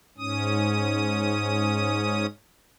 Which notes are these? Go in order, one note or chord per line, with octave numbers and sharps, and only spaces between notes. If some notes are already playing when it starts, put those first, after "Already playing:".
G#2 C#4 D#6